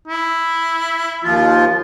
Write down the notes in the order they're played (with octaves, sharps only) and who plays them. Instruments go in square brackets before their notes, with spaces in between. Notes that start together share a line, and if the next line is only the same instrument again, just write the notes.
[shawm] E4
[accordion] D#2 F3 F4